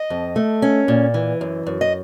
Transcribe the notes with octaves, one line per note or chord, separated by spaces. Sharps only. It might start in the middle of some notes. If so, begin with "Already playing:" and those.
Already playing: D#5
F2
A3
C#4
A#2
E3
F#2
F#2
D#5